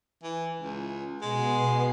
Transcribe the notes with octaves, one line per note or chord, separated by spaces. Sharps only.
E3
C#2
B2 G#3 B3 C7